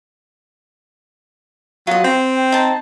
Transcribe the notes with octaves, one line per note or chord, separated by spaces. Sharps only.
F#3 F4 D#5
C4 G5
D#4 A5